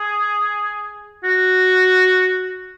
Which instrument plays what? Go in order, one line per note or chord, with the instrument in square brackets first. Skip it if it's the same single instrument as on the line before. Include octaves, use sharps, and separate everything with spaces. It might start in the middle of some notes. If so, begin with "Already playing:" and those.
Already playing: [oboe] G#4
F#4